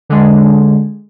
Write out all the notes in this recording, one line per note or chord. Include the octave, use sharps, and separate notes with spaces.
D3 G#3